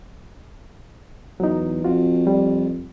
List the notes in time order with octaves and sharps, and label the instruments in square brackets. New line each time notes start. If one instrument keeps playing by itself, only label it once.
[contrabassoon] E2 [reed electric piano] F#3 D#4
[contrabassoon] F2 [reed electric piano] F4 F#4
[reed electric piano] G3